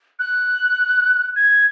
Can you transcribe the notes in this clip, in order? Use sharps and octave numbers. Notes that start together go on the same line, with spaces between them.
F#6
G#6